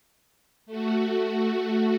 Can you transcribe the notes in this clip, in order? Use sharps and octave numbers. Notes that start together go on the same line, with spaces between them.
A3 F#4